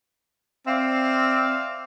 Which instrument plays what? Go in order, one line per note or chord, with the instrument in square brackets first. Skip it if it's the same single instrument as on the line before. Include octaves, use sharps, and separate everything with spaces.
[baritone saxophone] C4 [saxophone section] D5 E5 F5